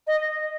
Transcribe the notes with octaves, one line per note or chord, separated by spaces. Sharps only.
D#5